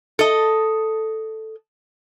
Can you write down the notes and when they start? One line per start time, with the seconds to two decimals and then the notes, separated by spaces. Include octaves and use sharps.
0.19 A4 D#5